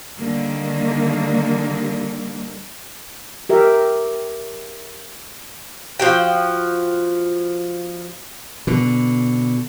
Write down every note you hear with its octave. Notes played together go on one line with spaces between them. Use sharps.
D3 D#3 G3 A#3
G4 A#4 E5
F3 F#4 G5
B2 D3